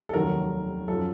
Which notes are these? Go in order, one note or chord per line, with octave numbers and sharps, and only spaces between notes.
A4
F1 D#2 D#3 F#3 A#4
F#2 F3 A4